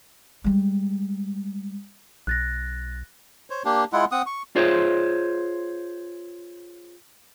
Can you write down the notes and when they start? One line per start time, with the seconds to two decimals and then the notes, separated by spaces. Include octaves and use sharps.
0.44 G3 G#3
2.27 B1 F#6 A6 A#6
3.50 C5 C#5
3.65 A#3 D4 G4
3.93 G#3 E4 F4 F#5
4.12 C4 F#5 D#6
4.26 C#6
4.56 F4 G#4 C5 C#5